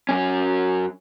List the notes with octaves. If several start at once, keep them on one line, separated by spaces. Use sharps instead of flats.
F#2 C#4